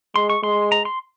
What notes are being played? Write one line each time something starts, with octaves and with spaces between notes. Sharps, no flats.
G#3 C6
C#6
G#3 C6
A#5
C6